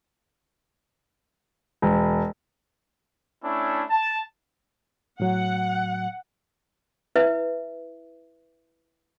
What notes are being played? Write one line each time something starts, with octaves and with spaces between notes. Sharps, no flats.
E1
A3 C#4 D4 E4
A5
A2 F#3 F#5
E4 B4 E5